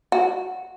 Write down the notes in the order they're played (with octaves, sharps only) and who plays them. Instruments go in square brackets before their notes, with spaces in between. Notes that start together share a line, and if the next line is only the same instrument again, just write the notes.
[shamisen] F#4